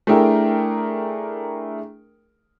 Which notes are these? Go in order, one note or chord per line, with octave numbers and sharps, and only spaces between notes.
A3 D4 E4 G#4 A#4 G5